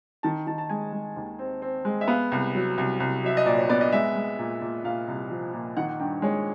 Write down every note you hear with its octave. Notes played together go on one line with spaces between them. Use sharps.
D#3 A5
D#3 A5
A5
G#3 G#5
G#3
D#2
C4
C4
G#3
E5
B3 F5
C2
F#3
C2
C2
F#3 E5
D#5
A#2 D5
C#5
B3 D5
D#5
G#3 E5
G#3
A#2
A#2
A#2 F5
C2
F3
A#2
D#3 F#5
F#5
G2 G5
G#3 C#5